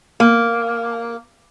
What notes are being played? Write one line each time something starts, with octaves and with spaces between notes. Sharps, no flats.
A#3